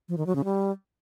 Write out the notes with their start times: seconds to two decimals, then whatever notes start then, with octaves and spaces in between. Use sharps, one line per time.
0.09 F3
0.18 D#3
0.27 F#3
0.35 C#3
0.44 G3